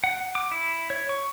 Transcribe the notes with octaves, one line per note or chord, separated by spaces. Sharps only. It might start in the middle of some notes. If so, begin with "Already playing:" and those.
F#5
D6
E4
C#5
C#6